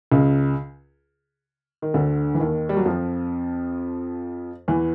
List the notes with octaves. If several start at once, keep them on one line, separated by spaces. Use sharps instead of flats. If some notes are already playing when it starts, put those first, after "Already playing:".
C#2 C#3
D#3
D2 D3
E3
D#2 D#3
G3
F#3
F2 F3
E2 E3